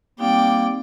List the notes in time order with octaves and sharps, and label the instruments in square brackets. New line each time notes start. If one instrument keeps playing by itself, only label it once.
[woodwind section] G3 A#3 [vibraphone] C4 D#4 [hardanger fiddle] D5 G5